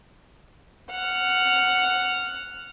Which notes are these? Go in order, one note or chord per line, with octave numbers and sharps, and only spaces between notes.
F#5 F6